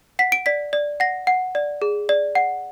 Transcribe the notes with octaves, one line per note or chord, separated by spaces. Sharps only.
F#5 B6
D7
D5 B6
D5
F#5 A#6
F#5
D5
G#4
D5
F#5